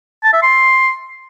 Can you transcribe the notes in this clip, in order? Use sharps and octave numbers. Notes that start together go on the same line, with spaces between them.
A5
E5
C6